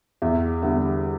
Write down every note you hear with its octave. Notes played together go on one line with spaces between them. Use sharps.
E2 E5
D3 G3 B3 E5